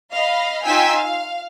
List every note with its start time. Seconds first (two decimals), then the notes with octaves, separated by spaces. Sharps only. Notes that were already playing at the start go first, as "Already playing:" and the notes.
0.13 D#5 F5 B5
0.65 D#4 F4 G5 G#5 E6 B6
0.99 F5